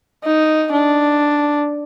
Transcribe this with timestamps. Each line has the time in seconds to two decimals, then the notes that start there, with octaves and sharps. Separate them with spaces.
0.24 D#4
0.72 D4